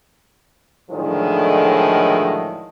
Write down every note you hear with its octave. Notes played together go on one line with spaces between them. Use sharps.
A2 D3 D#3 F3 F#3 G#3